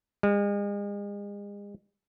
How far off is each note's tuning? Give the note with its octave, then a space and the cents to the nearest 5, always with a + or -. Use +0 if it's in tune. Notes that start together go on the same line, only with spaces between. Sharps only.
G#3 -40